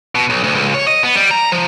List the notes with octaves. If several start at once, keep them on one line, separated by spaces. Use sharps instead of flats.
B2
B1
D2
C#2
C#5
D#5
B3
G3
A#5
F3